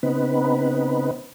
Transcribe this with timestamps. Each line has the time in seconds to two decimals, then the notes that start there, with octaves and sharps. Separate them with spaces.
0.03 C#3 B3 C4 D#4 B4